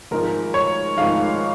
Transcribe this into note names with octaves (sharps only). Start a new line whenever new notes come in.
G#1 G#2 F3 G#3 A#4
C#5
G#1 G#2 F3 G#3 F5